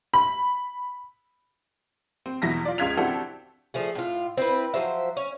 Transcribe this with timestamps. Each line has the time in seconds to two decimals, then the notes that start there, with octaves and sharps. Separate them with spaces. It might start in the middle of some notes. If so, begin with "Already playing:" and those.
0.14 B5
2.26 C4
2.42 E2 B2 F#3 E4 A#6 B6
2.65 F4 D5
2.78 C#2 C#3 F4 G#6 B6 F7
2.97 C4 D4 E4 F#4 G4 A4
3.74 F3 A3 G#4
3.95 A2 F4
4.37 C4 E4 B4
4.74 F3 F#3 C5 E5
5.17 C#4